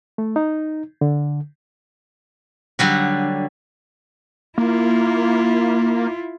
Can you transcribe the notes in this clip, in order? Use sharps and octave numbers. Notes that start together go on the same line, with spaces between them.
A3
D#4
D3
D3 F#3 G3 F#4
A#3 E4 F4